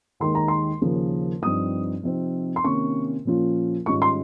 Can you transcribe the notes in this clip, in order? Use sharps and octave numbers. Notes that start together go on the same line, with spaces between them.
D#2 D#3 G#3 D#4 C6
A#5
C6
D#2 C#3 F3 A#3
G2 F3 C4 D#4 D#6
C3 F3 C4 D#4
C6
C3 D#3 A#3 C#4 C#6
A#2 F3 A#3 C#4 F4
G#2 D#3 G3 C#4 F4 C#6
C6